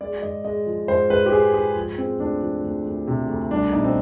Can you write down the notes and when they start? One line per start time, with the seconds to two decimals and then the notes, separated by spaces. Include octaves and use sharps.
0.01 G#3 D5
0.22 G#2 D#5
0.44 G#3 D#5
0.66 F3
0.88 G#2 C5
1.10 G#2 B4
1.26 G4
1.32 G#3 G#4
1.54 G#2 G#4
1.76 F3
1.98 G#3 C4
2.19 D2 D4
2.42 F3
2.63 D2
2.85 D2
3.07 C3
3.29 D2
3.51 C2 D4
3.73 B2 D#4
3.84 C4